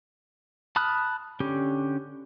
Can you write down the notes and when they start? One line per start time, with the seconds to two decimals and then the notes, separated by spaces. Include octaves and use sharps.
0.76 A5 B5 D#6 F6 F#6
1.40 D3 C#4 G4